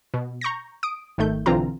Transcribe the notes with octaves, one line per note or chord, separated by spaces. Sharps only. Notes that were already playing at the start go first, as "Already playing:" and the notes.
B2
A#5 C#6 G6 A#6
D#6 D7
G#1 D#3 A3 G6
B1 D3 E3 C4 F4 A#5